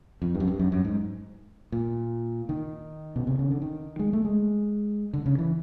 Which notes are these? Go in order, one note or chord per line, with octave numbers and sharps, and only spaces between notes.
F2
G2
F#2
G2
F#2
F#2
G#2
A#2
D#3
B2
C3
C#3
D3
D#3
G#3
A3
G#3
D3
C#3
E3